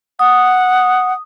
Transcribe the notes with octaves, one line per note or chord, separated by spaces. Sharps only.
F#5 D#6